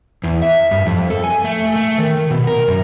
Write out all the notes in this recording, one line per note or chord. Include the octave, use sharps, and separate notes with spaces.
E2
E5
G2
F2
A4
G#5
A3
A3
D#3
B2
A#4
F#2